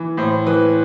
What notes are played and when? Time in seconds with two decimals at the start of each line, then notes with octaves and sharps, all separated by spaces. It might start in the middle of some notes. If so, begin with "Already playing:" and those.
Already playing: E3
0.17 A2 C5
0.47 E3 B4